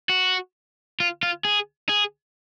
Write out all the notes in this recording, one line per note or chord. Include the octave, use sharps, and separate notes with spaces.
F#4
F4
F4
G#4
G#4